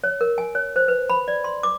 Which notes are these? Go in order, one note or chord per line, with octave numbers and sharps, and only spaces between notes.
C#5
A#4
G#5
C#5
C5
B4
B5
D5
C6
D6